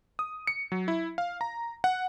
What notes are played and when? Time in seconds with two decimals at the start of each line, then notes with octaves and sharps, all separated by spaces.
0.19 D#6
0.47 C#7
0.72 F#3
0.88 E4
1.18 F5
1.41 A#5
1.84 F#5